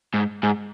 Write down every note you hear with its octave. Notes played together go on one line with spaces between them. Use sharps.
G#2
G#2